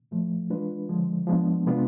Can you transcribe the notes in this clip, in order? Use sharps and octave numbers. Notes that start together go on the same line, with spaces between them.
A2 F3 A3
E3 G#3 D4 F4 B4
D3 F3 G#3
F3 G#3 B3 D4
C3 G#3 B3 D4 F4